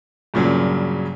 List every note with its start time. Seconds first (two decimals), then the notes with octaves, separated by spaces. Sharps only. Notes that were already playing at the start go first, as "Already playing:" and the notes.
0.34 G2 A#2 C#3 F#3